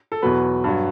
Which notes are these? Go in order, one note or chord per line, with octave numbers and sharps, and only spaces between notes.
A4
E2 B2 F#3 B4
G2 F#3